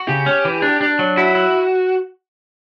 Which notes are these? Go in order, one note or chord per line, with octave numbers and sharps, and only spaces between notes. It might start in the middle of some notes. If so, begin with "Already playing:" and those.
Already playing: F#4
C#3 G4
C#4
E3
D4
D4
F#3
E4 F#4
E4